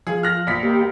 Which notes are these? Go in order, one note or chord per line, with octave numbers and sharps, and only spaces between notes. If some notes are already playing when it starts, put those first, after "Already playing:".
F3 G#4
F6 F#6 A#6
A#1 B6
A#3 G4